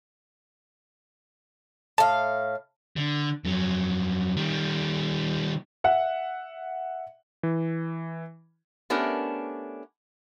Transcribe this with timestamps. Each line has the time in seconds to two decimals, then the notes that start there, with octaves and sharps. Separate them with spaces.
1.98 A2 F5 A5
2.97 D3
3.45 F2 F#3
4.37 D#3 G3
5.84 E5 F#5
7.43 E3
8.90 A3 B3 C#4 D4 G4 A#4